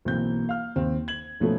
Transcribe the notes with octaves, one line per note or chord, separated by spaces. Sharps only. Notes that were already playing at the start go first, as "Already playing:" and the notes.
B1 E3 A#3 C4 G6
F5 F6
D#2 C4
G#6 F#7
B1 F3 A3 B3 C#4